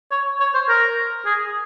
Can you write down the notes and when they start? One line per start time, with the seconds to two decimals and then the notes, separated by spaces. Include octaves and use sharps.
0.11 C#5
0.40 C#5
0.54 C5
0.69 A#4
1.26 G#4